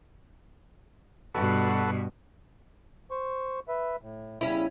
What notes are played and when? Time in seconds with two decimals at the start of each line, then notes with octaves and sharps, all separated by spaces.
1.35 G2 B2 F#4 A4 B4
3.11 C5 C#6
3.68 B4 E5
4.02 A2
4.41 E2 C#3 G3 C#4 E4